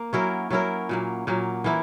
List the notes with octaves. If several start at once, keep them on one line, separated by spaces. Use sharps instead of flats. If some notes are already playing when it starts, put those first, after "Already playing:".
Already playing: A#3
F#3 C#4 E4 A#4
F#3 C#4 E4 A#4
A#2 F#3 A#3
A#2 F#3 A#3
E3 A#3 E4